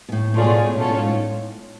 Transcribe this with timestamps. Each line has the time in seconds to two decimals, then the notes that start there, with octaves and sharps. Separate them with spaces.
0.09 B2
0.12 A2
0.34 A2 A3 C#4 F4 G#4 D5
0.44 B2
0.55 A2
0.66 A2
0.77 B2 C#4 F4 A4 C#5
0.88 A2
0.99 G#2
1.09 A2